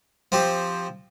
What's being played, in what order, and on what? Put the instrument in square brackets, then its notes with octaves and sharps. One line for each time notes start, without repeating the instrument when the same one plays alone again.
[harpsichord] F3 C4 G4